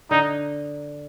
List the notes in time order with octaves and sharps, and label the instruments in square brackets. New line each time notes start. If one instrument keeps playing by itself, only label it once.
[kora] D3 [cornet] D#4